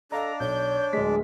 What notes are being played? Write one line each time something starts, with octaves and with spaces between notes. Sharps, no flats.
D4 A4 D#5 F5 A#5
B1 C#5 G6
D1 G#3 B6